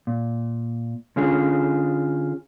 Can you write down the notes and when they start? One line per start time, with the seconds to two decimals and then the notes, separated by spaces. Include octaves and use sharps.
0.07 A#2
1.16 D3 C#4 F4 G#4